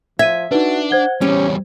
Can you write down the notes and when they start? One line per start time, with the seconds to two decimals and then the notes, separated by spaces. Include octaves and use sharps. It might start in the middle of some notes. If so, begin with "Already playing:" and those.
0.19 F3 E5 G#6 D#7
0.52 D4 D#4 F#4 B4
0.91 C5 F#5 G#6 G7
1.21 E2 G3 C#4 G4 C#5